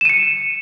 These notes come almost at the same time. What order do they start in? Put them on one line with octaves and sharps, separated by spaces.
E7 D#7 C#7